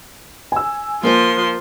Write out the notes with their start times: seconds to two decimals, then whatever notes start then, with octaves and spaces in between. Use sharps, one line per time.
0.52 G#5 E6
1.03 F3 A#3 A#4 C5 C6